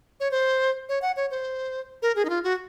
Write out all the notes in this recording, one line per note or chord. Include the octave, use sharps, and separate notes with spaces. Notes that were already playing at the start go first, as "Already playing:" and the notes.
C#5
C5
C#5
F#5
C#5
C5
A#4
G#4
D#4
F4
F#4